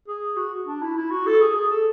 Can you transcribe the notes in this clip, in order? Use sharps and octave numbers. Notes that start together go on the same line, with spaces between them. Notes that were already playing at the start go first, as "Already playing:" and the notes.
G#4
F#4
D4
E4
E4
F#4
A4
G#4
G#4
A4